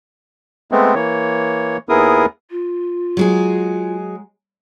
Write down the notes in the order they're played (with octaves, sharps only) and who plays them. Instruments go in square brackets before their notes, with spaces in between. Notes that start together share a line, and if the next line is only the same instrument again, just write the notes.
[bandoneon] G#3 A3 B3 C4
E3 A#3 C#5
D#2 B3 E4 G#4 A#4 D#6
[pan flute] F4
[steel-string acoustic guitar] F#3 G#3 G#4